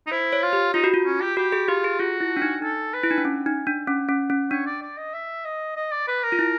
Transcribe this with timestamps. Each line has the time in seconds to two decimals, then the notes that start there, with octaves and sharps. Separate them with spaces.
0.07 D#4
0.11 E4 C5
0.33 C#5
0.43 F4
0.53 G4
0.73 D#4 F4
0.84 F#4
0.94 F4
1.05 C#4
1.21 G4
1.37 F#4 G4
1.52 G#4
1.68 F4 G4
1.84 G#4
1.99 F4 F#4
2.21 E4
2.37 D4
2.42 D#4
2.62 D#4 A4
2.94 B4
3.03 E4
3.11 D#4
3.18 D4
3.25 C#4
3.46 D#4
3.67 D4
3.88 C#4
4.09 C#4
4.30 C#4
4.51 D4 C#5
4.66 D5
4.82 D5
4.97 D#5
5.13 E5
5.45 D#5
5.76 D#5
5.91 D5
6.08 B4
6.23 A#4
6.32 F4
6.39 E4